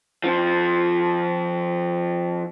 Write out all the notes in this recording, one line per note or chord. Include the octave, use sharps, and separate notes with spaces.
F2 F3